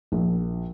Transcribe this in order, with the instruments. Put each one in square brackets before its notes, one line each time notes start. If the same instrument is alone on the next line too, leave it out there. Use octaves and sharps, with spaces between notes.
[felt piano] A#1